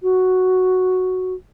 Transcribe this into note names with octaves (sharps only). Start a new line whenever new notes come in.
F#4